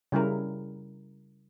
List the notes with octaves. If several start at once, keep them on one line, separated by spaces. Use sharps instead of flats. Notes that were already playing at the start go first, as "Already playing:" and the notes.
C#3 G3 E4 A#4